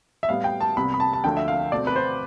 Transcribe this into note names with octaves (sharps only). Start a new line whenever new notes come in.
E5
A2 G3 B3 F5
G5
A5
C2 C3 G3 B3 B5
B5
A5
A5
D2 D3 F3 A3 G5
E5
F5
B2 A3 C4 D5
B4
C5